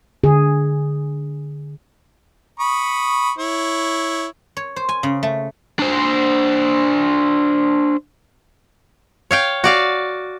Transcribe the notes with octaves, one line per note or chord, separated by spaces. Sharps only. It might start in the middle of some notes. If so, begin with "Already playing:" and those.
D3 G#4
B5 C#6 D#6
E4 C#5
C#5
C5
G#5
C#3
A3
D4 C5
C#5 F5 G5
F#4 D5 F5